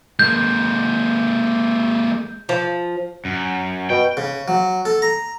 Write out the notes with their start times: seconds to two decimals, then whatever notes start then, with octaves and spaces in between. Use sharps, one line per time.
0.19 G#3 A#3 G6
2.49 F3
3.25 F#2
3.90 B2 G5
4.17 C#3
4.48 F#3
4.85 A4
5.02 A#5